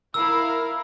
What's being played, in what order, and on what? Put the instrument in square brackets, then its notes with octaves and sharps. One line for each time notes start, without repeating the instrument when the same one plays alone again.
[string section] E4 A#4 F5 [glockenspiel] E6